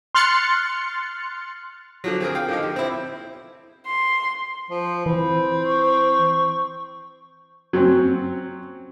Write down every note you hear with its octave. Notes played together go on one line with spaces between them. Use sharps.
C6 F6 F#6 A6 C#7
D3 F3 F#3
C4 G#4 A#4
F5 G5
D3 F3 D#4
G4
C4 E4
C6
F3 C5
E3 C4 B5
C#6
F#3 C4 C#4